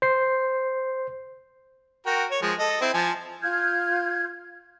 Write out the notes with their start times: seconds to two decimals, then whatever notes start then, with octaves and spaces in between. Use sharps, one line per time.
0.02 C5 C7
2.06 F#4 A#4 G5
2.31 C#5
2.42 F3 G#3
2.59 A4 D#5
2.81 C4 E4
2.94 F3 G#5 A5
3.42 F4 F6 G6 G#6